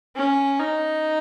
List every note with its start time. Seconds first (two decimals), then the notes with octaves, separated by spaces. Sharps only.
0.16 C#4
0.59 D#4